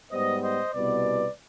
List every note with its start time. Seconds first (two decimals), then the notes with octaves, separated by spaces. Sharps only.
0.12 G#2 G3 B3 C5 D#5
0.42 C5 D#5
0.74 C2 B2 B3 B4 D5